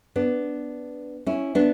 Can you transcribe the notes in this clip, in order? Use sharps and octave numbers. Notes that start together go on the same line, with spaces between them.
B3 D4
C#4 E4
B3 D4